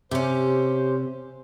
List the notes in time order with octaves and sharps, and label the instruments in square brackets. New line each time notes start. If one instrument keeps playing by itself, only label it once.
[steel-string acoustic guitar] C3 [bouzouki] C#4 G4 [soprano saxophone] C5